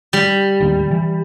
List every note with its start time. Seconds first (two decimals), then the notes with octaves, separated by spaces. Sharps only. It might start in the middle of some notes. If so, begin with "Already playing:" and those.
0.13 G3
0.60 A1 D#2 D#3
0.91 E3